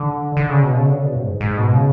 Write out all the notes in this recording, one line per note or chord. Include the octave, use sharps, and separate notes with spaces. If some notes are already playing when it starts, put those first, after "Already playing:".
Already playing: D3
D3
C#3
B2
C#3
D3
C#3
B2
F#2
G#2
G#2
B2
C#3